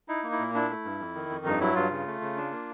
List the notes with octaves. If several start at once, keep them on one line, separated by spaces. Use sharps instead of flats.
D#4 E4
A#3
E4
A#2
D4 E4
A3
G2
F2
D#3
F2
G2 D#4
F#3 E4
G2 F4
C#3
A3
C#3
D4
A#3